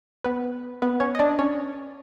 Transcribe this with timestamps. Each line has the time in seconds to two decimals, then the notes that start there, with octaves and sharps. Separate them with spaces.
0.24 B3 B4
0.82 B3 B4
1.00 C#4 C#5
1.15 D#5
1.19 D4 D5
1.39 C#4 C#5